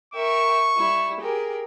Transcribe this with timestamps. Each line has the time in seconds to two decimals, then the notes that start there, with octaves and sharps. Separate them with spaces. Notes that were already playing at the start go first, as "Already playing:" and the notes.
0.14 A#4 E5 G5 C#6
0.76 G3 E4
1.20 G4 G#4 A#4